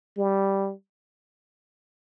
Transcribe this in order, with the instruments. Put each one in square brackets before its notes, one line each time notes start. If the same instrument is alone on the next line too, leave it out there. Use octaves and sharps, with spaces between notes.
[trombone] G3